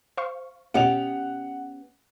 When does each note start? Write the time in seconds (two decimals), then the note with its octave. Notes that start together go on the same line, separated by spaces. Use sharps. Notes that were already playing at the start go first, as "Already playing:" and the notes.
0.17 C5 F5 C#6
0.74 B2 B3 C#4 G4 D#5 F#5 C#7 F7